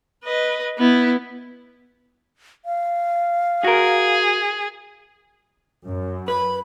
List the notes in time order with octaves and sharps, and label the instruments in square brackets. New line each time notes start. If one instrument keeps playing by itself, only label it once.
[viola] B4 D#5
B3 E4
[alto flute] F5
[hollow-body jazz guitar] F#4 A#4 [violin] G#4
[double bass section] F#2
[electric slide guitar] B4 [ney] B5